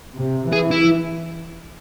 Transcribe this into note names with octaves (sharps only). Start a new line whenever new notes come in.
C3
E3 G#4
E4